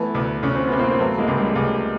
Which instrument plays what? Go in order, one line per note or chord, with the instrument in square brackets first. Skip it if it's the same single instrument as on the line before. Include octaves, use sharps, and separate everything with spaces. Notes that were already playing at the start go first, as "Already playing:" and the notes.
Already playing: [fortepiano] E3 [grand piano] A3 B3
[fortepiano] D2
[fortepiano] D2 [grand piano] C#4
[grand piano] C4
[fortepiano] C3 [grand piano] B3
[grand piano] A#3 C4
C4
[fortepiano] F#3 [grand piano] A3 B3
[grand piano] G#3 A#3
[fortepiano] C#2
[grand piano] G3 A3
[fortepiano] C#2